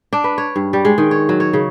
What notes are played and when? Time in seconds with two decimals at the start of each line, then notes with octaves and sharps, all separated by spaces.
0.13 D4
0.24 B4
0.38 C#5
0.56 G2
0.73 G3
0.85 G#3
0.98 D#3
1.11 C#5
1.29 F#3
1.40 C#5
1.53 C#3